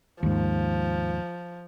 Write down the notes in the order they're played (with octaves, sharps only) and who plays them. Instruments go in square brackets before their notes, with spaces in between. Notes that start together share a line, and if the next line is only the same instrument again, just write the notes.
[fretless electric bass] D#2 G#2 [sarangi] F3